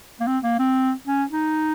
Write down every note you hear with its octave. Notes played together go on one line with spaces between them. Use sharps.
A#3
C4
A#3
C4
C#4
D#4